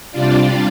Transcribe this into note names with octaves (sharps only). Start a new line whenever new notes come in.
C3 G3 D4 F4 D5